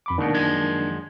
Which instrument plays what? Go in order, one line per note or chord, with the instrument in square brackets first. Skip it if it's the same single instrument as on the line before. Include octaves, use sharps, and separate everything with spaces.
[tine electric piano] F2 B5 D6
[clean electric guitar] C#2 B2 [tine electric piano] D#3 A#3 D4
[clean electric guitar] F#2 F3 G#3